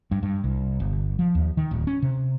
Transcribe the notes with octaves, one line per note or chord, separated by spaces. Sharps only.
G2
G2
C2
G1
F3
D#2
D#3
D1
C#4
C3